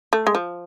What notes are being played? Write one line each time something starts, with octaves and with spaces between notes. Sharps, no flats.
A3
G#3
F3